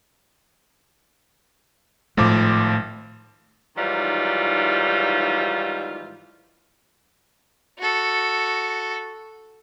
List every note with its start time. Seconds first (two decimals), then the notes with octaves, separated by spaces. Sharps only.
2.17 G#1 A2 F3 A3 D6
3.77 G#2 D#3 E3 F#3 G3 F4
7.79 F#4 A4